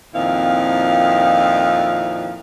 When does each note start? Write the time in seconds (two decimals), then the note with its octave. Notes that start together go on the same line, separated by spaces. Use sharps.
0.14 F2 A#2 D#3 C4 E4 F5